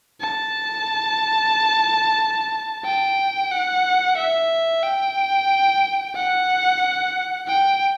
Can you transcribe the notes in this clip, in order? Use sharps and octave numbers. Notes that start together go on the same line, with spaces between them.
A5
G5
F#5
E5
G5
F#5
G5